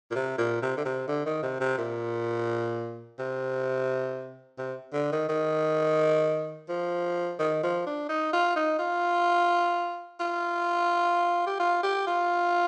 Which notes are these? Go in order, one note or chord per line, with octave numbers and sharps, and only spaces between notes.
A#2
C3
A#2
C3
D3
C3
D3
D#3
C3
C3
A#2
C3
C3
D3
D#3
D#3
F3
D#3
F3
D4
D#4
F4
D#4
F4
F4
G4
F4
G4
F4